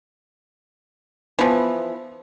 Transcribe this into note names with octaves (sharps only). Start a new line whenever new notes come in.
E3 F3 B3